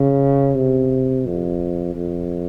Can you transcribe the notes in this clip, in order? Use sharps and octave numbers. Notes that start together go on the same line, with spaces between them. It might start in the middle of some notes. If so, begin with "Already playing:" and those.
Already playing: C#3
C3
F2
F2